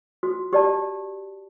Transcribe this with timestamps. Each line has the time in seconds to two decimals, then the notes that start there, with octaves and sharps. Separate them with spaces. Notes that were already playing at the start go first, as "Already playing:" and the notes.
0.23 F#4
0.53 G4 D5 A5